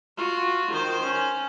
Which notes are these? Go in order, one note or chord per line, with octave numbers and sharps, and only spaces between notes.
F4 F#4
D#3 C5
C#4